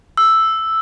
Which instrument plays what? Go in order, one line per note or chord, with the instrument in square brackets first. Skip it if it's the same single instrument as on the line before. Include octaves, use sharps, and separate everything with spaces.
[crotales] E6